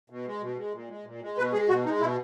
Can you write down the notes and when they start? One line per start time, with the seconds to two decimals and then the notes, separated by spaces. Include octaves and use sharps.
0.10 B2
0.26 G#3
0.42 B2
0.57 G#3
0.73 A#2
0.89 G#3
1.05 A#2
1.22 G#3
1.37 B2 B4
1.53 G#3 G#4
1.69 B2 F#4
1.85 G#3 D#4
2.01 B2 E4